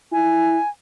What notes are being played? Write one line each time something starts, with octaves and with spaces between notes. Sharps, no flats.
E4 G#5